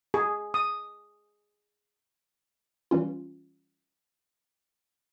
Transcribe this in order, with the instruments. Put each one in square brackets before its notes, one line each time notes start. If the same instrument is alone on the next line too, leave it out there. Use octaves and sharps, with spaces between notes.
[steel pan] G#4
D#6
[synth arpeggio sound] E3 G3 C#4 F4